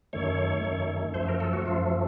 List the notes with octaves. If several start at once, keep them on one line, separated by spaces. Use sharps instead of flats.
F#2 D#3 A3 C#5
F#2 D#3 A3
F#2 F3 A3 C5
A#4
A4
F#4
F#2 F3 A3 F4